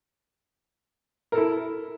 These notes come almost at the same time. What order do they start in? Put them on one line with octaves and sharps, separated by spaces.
A#4 A4 E4